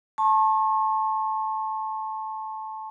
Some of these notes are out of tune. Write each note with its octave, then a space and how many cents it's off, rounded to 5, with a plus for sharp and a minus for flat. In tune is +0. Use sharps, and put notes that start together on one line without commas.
A5 -10 C#6 -40